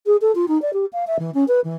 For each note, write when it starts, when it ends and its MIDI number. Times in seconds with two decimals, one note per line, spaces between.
0.06 0.16 68
0.21 0.32 69
0.35 0.45 65
0.48 0.60 63
0.61 0.70 74
0.73 0.85 67
0.92 1.04 77
1.07 1.16 76
1.19 1.30 52
1.34 1.44 61
1.48 1.60 71
1.64 1.76 52